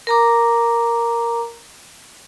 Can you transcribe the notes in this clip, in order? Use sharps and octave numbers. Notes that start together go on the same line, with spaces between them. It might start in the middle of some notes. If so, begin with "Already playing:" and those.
A#4 A#5 D6